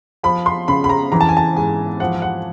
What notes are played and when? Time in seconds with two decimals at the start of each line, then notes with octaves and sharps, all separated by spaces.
0.23 F3 B5
0.46 C6
0.68 C#3 B5
0.84 B5
0.89 A#5
1.12 E3 A#5
1.21 A5
1.29 G#5
1.37 A5
1.56 G#2 G#5
2.00 F3 F#5
2.22 F#5